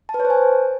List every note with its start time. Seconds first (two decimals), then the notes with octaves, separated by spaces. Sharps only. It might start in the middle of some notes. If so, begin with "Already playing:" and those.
0.09 A5
0.14 B4
0.20 C#5
0.25 C5
0.30 G#5